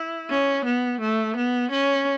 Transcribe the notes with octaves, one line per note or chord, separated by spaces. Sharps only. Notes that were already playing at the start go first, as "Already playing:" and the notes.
Already playing: E4
C#4
B3
A3
B3
C#4